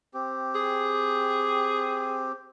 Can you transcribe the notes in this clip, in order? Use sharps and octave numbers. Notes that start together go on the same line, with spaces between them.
C4 G4
G#4